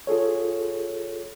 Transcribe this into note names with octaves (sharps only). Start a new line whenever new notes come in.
F4 G#4 A4 C#5